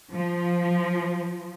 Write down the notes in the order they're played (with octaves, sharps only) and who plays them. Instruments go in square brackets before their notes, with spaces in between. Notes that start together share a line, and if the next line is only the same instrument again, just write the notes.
[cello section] F3